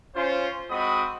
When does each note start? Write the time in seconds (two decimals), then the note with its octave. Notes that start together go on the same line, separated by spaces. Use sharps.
0.15 C#4 F4 C5
0.69 G#3 C4 F#4 D#5 B5 D#6